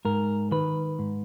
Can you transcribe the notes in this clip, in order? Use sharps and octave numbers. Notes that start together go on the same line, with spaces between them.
G#2 A#4
D#3 B4
G#2